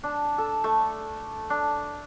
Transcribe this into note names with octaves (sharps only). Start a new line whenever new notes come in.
D4
A4
A3
D4